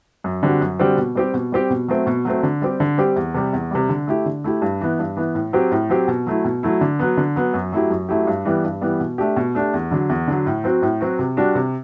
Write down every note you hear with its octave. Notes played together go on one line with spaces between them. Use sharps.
F#2
D3 G3 C4 F#4
F#2
D3 G3 C4 F#4
B2
G3 C4 G4
B2
G3 C4 G4
B2
F#3 A3 C4
B2
F#3 A3 C4
D3
G3 C4 G4
D3
G3 C4 G4
E2
C3 G3
E2
C3 G3
D3
A3 E4 G4
D3
A3 E4 G4
G2
E3 B3
G2
E3 B3
A2
F#3 C4 G4
A2
F#3 C4 G4
B2
F#3 A3 E4
B2
F#3 A3 E4
D3
F#3 B3
D3
F#3 B3
F#2
F#3 A3 E4 G4
F#2
F#3 A3 E4 G4
G2
E3 G3 B3
G2
E3 G3 B3
B2
A3 D4 G4
B2
A3 D4 G4
E2
D3 F#3
E2
D3 F#3
A2
F#3 C4 F#4
A2
F#3 C4 F#4
C3
G3 D4 F#4
C3